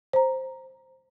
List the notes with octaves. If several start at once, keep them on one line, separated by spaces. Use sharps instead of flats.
C5 A#5